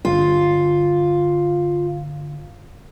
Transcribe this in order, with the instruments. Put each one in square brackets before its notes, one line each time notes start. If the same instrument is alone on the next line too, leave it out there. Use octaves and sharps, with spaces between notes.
[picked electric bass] G1 [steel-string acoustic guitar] F4